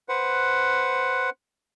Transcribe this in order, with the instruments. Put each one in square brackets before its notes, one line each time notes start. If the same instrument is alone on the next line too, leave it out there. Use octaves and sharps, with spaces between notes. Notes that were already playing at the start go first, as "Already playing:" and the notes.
[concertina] B4 C5 F#5